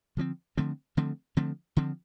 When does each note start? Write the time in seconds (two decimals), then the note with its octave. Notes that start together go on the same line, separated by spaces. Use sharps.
0.17 D3 F3 A3 C4
0.58 D3 F3 A3 C4
0.97 D3 F3 A3 C4
1.37 D3 F3 A3 C4
1.77 D3 F3 C4